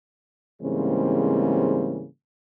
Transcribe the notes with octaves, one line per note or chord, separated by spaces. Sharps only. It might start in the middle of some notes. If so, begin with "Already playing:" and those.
G#2 C#3 E3 G3 A#3 C4